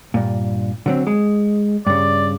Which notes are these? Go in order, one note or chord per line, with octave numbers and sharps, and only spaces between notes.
G2 A#2
D3 F#3 C4
G#3
G2 C#3 D5